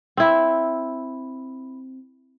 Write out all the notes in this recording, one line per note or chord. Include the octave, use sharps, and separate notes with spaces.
C4 E4